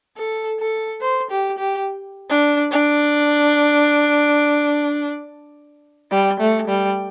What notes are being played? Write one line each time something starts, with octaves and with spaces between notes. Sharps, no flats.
A4
A4
C5
G4
G4
D4
D4
G3
A3
G3